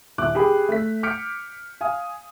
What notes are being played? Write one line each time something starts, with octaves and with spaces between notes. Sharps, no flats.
D#1 E4 D6 F#6
G4 G#4 B5
A3 B6
D6 F6 G6 B6 C#7 D7
F5 G#5 D#6